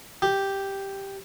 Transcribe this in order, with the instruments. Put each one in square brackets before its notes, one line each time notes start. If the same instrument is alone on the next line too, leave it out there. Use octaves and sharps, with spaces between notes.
[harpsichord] G4